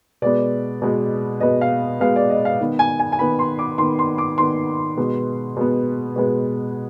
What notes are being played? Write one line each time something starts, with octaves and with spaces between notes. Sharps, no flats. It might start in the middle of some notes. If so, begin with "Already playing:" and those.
B2 G#3 B3 D5
B2 G#3 B3
B2 G#3 B3 D#5
F5
B2 G#3 B3 F5
D5
D#5
F5
D#3 B3
G#5
G#5
G#5
D#3 B3 B5
C6
D6
D#3 B3 C6
C6
D6
D#3 B3 C6
B2 G#3 B3
B2 G#3 B3
B2 G#3 B3